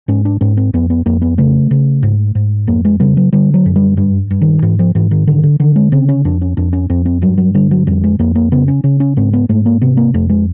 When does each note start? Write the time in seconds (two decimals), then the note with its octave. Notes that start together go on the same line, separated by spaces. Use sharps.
0.08 G#2 C#4
0.25 D4
0.41 G#2 C#4
0.57 C4
0.74 F2 B3
0.90 B3
1.06 F2 A#3
1.22 B3
1.38 C#3 A3
1.71 C#3
2.03 G#2
2.35 G#2
2.67 F2 A#3
2.85 G#3
3.00 C#3 G3
3.17 F#3
3.33 D3 G3
3.54 F#3
3.66 F#2
3.76 G3
3.97 G2 G3
4.31 G2
4.41 D#3
4.62 G#2 E3
4.79 F3
4.95 G#2 E3
5.11 D#3
5.27 D3 D#3
5.44 D3
5.60 D3 D#3
5.76 G#3
5.92 C#3 C4
6.09 C#4
6.25 F2 D4
6.41 C#4
6.57 F2 D4
6.73 C#4
6.90 F2 C4
7.06 C4
7.22 G2 F#3
7.38 F#3
7.55 D3 G3
7.71 F#3
7.87 F2 G3
8.04 G#3
8.19 F2 A#3
8.35 A#3
8.52 C#3 B3
8.68 C#4
8.84 C#3 C#4
9.00 C#4
9.17 G#2 C4
9.33 B3
9.49 G#2 A3
9.66 A#3
9.81 C3 B3
9.97 A#3
10.14 F2 A3
10.29 G#3